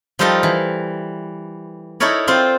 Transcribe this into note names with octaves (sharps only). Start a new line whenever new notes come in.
F3 G3 D#4 F4 A4 A#4
E3
D#4 E4 A4 A#4 C#5 D5
C4 F4 C5 D5